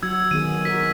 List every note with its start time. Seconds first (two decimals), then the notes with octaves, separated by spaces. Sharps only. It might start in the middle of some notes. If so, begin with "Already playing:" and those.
0.03 F#3 F#4 E6 G#6
0.31 D#3 B3 G#4 D#7
0.65 F#4 A#4 B6